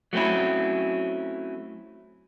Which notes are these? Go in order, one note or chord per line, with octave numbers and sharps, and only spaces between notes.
F#3 A3 C4 C#4 E4